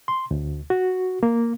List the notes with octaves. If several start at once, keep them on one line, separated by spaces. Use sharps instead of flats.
C6
D2
F#4
A#3